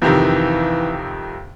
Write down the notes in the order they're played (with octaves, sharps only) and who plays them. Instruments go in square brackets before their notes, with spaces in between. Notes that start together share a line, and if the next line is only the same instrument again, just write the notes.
[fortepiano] F2 C3 D#3 [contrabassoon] E3